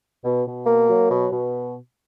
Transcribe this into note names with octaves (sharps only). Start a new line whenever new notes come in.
B2
B2
A#3
F#3
B2
B2